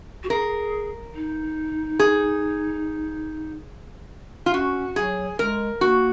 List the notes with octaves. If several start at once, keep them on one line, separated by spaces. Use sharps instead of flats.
F#4
G#4 A#4
D#4
G#4
F4
C#4 F#4
F#3 G#4
G#3 A#4
A#3 F#4